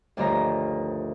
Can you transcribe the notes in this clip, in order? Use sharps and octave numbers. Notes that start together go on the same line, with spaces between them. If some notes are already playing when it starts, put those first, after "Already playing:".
D2 G2 D#3 F3 C#5 A#5